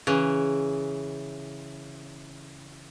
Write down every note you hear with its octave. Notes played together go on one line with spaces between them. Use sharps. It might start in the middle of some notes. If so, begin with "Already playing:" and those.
C#3 E3